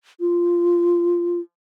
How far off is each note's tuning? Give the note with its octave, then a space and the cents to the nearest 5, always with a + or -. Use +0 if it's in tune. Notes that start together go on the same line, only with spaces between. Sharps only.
F4 -10